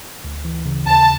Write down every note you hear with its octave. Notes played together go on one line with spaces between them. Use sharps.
D2
E3
C#3
D#2 A5